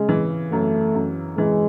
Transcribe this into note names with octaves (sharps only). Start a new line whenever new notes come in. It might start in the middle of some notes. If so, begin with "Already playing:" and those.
Already playing: C#3 G#3
E3
F#2 A3
F#2
E3 G#3